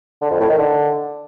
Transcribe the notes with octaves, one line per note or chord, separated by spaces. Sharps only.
D3
F2
A2
D#3
D3